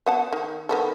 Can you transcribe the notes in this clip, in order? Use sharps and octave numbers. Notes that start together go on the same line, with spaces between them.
B3 F#5 A5
D#3
D#3 B3 A4